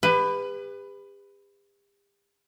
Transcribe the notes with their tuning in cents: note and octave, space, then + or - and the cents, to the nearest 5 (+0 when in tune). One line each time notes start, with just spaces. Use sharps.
G4 +45 B4 +15